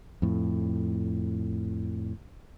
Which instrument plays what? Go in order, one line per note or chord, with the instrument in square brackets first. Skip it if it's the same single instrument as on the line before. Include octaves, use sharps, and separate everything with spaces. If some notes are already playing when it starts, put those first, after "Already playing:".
[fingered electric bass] F2 A2